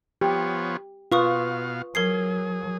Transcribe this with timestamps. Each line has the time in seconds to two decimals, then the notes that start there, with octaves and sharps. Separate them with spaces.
0.21 F3 B3 G4 C#5
1.12 B2 F4 B4 F5 C#6 D#6
1.95 F#3 G#4 A#4 G#6 C7